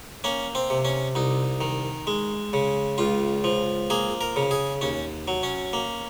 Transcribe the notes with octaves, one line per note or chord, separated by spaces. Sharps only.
A#3 C#4
C4
C3
C#4
C2 D#4
D#3
G#3
C#3
C#2 F4
F3
A#3 G#4
A#4
C#3
G#4
D#2 C#4
F#3
C#4
A#3